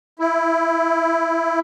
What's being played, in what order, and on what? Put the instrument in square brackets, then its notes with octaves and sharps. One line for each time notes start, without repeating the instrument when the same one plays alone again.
[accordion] E4